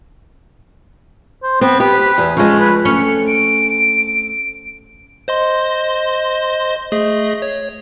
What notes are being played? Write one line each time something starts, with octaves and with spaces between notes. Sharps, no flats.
C5
B3 C4
G4 B4
E2
F3 G#3 C#4
B4
A3 C4 C#4 C#7
D7
C5 D#5 C6
A3 G#4 D#5
C#5